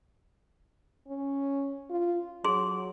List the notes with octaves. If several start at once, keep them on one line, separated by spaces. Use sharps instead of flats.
C#4
F4
F#3 G#4 C6